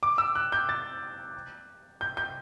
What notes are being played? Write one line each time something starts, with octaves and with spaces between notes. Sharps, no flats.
D6
E6
F#6
G6
A6
G6
G6